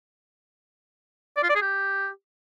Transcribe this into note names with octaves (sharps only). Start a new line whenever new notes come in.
D5
F4
D5
G#4
G4